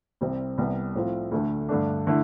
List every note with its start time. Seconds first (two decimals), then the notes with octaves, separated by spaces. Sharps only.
0.21 C2 C3 G3 C4
0.58 C2 C3 G3 B3
0.95 A2 F3 C4 F4
1.31 D2 D3 A3
1.69 G2 D3 A3 D4
2.07 D3 A3 E4